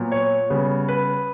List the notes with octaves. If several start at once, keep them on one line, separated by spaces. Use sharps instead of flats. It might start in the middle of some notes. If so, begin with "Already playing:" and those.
Already playing: A#2 F#3 B3
C#5
C#3 G3 B3
B4